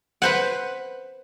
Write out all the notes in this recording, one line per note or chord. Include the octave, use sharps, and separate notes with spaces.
B4 C5 F#5